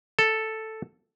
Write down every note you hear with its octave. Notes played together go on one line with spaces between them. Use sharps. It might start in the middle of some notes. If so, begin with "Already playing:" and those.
A4